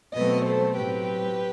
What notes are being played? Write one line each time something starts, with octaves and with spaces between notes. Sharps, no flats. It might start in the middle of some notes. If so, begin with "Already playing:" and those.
B2 F#3 A3 C4 B4 D#5
A4 C5
A2 F#3 C4 G4 B4